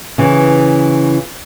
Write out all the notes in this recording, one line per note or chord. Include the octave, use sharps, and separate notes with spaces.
C#3 E3